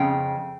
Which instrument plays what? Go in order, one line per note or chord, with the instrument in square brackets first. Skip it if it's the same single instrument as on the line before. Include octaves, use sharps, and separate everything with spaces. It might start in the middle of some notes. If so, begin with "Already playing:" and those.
Already playing: [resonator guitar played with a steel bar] F2 C#3 G5